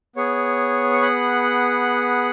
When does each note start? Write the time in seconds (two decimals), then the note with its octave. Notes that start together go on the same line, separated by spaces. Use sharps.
0.16 B3 G#4 C#5
0.93 C#6
1.02 F#5 B5